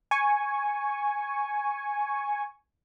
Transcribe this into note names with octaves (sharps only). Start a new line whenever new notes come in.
G#5 C#6